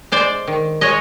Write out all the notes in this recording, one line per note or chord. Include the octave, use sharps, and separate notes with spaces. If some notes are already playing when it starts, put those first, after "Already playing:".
G#3 C5 D5
D#3
G#3 C#5 D#5